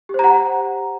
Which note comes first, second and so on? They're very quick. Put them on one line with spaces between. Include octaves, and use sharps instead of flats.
G4 C5 A#5 F#5